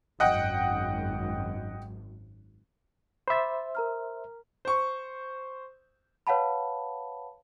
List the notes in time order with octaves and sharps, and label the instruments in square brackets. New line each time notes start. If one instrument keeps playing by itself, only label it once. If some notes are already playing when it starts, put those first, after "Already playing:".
[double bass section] G#1 F#2 [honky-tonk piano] D#5 F#5 G5
[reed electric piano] C5 E5 [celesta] B5 D6 A6
[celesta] A#4 A#5 F6
[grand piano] C5 C#6
[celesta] B4 C#5 F5 F#5 A5 B5